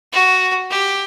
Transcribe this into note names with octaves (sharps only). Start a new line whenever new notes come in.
F#4
G4